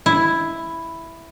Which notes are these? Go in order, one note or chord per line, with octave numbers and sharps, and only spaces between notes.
E4